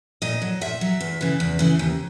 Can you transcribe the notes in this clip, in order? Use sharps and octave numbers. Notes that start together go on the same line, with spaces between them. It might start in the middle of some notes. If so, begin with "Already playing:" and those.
A#2 D#5
F#3
A#2 E5
F#3
E2
C#3 E3
E2
C#3 E3
D#2